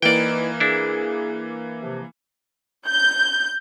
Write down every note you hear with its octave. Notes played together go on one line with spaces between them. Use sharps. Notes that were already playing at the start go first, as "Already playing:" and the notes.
E3 A#3 D#4 E4 B4 D5 G5
D4 E4 G#4
C3 F3
G6